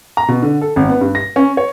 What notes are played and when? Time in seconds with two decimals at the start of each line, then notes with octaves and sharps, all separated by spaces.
0.17 A#5
0.28 B2
0.42 D3
0.61 A4
0.76 G#1
0.89 B3
1.01 G2
1.15 A#6
1.36 C#4
1.57 C#5